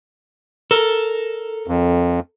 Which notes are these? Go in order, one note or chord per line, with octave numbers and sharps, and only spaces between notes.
A4 A#4
F2